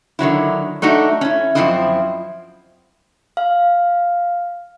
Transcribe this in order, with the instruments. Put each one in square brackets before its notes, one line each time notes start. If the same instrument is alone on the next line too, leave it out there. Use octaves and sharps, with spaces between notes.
[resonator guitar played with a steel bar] D3 D#3 F#3 E4
A3 D4 D#4 F#4
C#4 E4
F#2 E3 F3 C4 E4 D#5
[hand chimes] F5